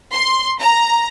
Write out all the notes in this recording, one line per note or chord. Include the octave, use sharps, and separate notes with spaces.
C6
A#5